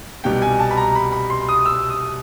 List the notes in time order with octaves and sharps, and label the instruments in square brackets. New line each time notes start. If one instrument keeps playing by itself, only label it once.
[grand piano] C2 B2 G3 G5
G#5
A5
B5
A#5
B5
B5
C6
D#6
E6
D#6